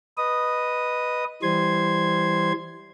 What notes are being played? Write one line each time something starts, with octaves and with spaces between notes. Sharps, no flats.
B4 D#5 D#6
E3 G3 C5 C6 G#6